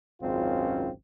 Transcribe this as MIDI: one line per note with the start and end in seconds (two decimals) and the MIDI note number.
0.22 0.89 32
0.22 0.89 37
0.22 0.89 42
0.22 0.89 49
0.22 0.89 60
0.22 0.89 65